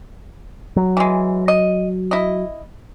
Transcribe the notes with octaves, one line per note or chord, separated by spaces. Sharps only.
F#3
E3 G#3
D#5
E4 D#5